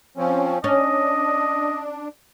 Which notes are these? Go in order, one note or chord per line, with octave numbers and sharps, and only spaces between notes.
F3 C4 C#4
C#4 D4 D#5